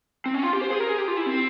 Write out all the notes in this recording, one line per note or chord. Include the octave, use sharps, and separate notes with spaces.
C4
C#4
F4
G4
C5
G#4
A#4
G#4
G4
F4
E4
C4